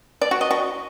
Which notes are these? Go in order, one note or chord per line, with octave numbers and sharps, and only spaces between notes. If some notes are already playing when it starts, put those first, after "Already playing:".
D5
F#4
D#5
F#4